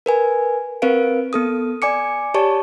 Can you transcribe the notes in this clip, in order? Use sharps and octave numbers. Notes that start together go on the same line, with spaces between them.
A#4 B4 G#5
C4 A#4 B4 F5 D7
B3 A4 D#6
D5 G#5 D6 C#7
G4 C#5 D5 A5 C#6